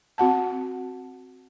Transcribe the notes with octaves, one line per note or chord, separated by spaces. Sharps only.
C4 F#4 F#5 A5